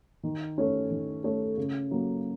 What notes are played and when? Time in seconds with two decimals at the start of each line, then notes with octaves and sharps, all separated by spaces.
0.23 D#3
0.58 A3 C#4 A4 C#5
0.91 D#3
1.24 A3 C#4 A4 C#5
1.57 C#3
1.91 F#3 A#3